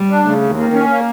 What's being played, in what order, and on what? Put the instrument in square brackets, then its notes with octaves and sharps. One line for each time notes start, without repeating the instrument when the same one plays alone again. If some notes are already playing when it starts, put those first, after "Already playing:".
Already playing: [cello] G3
[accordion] D4
[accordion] C#3 [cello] A3
[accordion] D#2
[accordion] D#3 [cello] A#3
[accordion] C#4
A#3